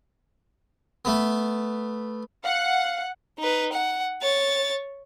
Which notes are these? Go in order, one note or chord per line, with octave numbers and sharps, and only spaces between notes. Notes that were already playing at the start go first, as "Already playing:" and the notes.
A3 B3
F5 F#5
D#4 B4
F#5
C#5 A6